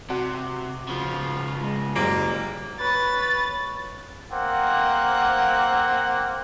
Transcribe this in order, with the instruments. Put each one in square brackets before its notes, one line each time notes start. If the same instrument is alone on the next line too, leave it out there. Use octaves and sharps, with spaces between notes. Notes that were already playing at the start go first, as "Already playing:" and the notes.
[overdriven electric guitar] C3 [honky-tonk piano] F#4
[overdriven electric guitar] C#3 F3 [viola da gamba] F4
[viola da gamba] G#3
[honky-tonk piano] F#1 F#3 D7 [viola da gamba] G3 [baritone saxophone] A#3
[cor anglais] B4 [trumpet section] C#5 B5 [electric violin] A6
[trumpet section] A#3 C4 F#5